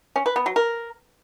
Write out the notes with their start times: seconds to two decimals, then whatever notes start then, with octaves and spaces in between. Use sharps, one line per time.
0.16 C#4
0.26 B4
0.36 B3
0.46 F#3
0.56 A#4